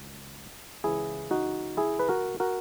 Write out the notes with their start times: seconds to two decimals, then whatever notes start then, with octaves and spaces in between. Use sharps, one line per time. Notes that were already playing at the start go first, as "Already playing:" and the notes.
Already playing: C#2
0.84 C#2 C#3 E3 E4 G#4
1.31 D#4 F#4
1.77 E4 G#4
1.99 B4
2.09 F#4 A#4
2.40 F#4 A#4